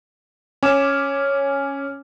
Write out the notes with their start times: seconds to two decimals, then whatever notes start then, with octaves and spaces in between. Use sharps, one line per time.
0.63 C#4 G#5 D6 E7